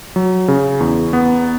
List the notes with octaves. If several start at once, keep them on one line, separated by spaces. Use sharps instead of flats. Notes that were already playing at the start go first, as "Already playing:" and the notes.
F#3
C#3
E2
B3